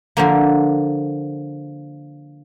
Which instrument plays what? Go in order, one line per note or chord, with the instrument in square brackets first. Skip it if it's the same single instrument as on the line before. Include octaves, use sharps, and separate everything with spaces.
[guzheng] D3 F3 A#3